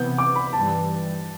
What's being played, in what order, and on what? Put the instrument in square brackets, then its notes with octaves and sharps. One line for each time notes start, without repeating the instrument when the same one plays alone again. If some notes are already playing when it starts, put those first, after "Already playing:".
Already playing: [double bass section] C3 E3 B3 [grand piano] G6
[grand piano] D6
B5
[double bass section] G2 E3 G3 [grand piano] A5